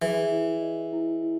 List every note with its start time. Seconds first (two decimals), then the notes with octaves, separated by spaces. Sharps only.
0.01 E3 G#4
0.32 E4
0.62 D#5
0.93 E4
1.23 E4